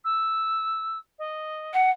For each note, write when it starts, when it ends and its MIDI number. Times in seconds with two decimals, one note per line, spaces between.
0.05 0.98 88
1.19 1.72 75
1.73 1.91 78